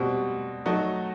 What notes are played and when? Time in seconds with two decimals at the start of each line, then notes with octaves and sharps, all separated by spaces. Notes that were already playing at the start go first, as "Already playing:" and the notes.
Already playing: B2 G3 C4 F#4
0.66 F#3 A3 D#4 F#4